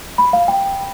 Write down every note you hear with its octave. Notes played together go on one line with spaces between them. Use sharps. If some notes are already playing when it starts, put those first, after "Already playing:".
B5
F5
G5